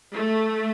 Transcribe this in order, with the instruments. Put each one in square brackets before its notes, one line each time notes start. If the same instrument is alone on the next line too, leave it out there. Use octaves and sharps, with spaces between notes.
[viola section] A3